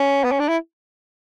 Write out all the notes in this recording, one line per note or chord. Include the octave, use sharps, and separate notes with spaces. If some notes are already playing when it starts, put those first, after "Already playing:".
Already playing: C#4
B3
C#4
D4
E4